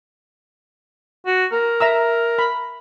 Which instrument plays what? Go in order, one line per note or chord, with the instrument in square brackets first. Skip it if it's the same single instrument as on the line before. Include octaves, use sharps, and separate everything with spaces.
[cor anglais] F#4
A#4
[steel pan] E5 A#5 E6
B5